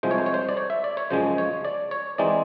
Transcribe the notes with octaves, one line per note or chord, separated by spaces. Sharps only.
C2 C3 F3 G#3 C5
C#5
C5
C#5
C5
D5
C#5
E5
D5
C#5
F#2 C#3 F3 G#3 C5
C#5
D5
C#5
E3 G#3 C4 D#4 D5